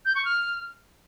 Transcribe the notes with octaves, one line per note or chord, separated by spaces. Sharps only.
G6
C#6
F6